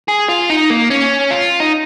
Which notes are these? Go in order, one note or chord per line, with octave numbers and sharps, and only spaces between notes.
G#4
F4
D#4
A#3
C#4
F4
D#4